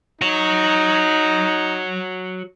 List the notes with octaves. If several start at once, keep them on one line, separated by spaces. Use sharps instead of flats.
D#4 F#4 C#5